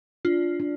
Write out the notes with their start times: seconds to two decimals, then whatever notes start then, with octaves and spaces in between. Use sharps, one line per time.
0.25 D4 F4
0.60 D4